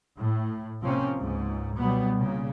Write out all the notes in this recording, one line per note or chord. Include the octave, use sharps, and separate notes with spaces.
A2
C3 F3 A#3 C4 C#4
C#2 G#2
B2 F#3 G3 B3
A#2 C#3